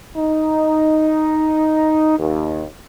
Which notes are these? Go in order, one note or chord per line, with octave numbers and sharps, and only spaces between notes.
D#4
D#2